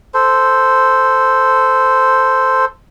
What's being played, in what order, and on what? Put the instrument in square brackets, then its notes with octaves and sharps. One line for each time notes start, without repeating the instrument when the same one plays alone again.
[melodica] A4 C5